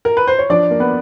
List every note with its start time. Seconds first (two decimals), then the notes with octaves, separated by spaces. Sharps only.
0.05 A#4
0.17 B4
0.27 C5
0.39 C#5
0.50 F3 D4 D5
0.71 A#3
0.80 B3 B4